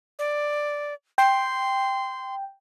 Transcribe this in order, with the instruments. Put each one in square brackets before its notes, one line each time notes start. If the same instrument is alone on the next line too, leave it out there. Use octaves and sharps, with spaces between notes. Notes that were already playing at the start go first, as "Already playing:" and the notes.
[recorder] D5
[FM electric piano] G5 [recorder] C6